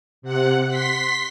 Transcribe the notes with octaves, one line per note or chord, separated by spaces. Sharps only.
C3 F#5
C6 B6